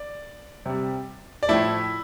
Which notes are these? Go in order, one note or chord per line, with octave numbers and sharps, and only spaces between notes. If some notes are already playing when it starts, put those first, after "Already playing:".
Already playing: D5
C3 G3
D5
A2 F3 A3 E4 E5